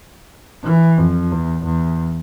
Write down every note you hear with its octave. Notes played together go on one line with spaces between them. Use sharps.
E3
F2
E2
E2